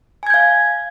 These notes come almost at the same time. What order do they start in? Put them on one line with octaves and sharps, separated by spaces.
G#5 G#6 G6 F5